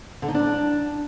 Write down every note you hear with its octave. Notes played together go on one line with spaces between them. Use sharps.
D3
D#4
D4